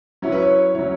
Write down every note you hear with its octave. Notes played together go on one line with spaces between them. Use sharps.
F#3 C#4 E4 C#5
B4
C#5
F#3 C#4 E4 C#5